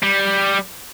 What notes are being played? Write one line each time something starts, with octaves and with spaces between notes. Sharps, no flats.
G3